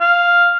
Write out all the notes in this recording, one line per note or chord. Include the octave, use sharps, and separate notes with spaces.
F5